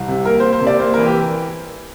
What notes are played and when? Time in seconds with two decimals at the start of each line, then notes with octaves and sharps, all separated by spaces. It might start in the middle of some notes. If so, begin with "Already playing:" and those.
Already playing: C2
0.08 C3
0.25 A#3 A#4
0.40 C5
0.45 A#3
0.53 C5
0.61 C3
0.67 D5
0.79 A#3 C5
0.94 E3 A#4
1.06 G4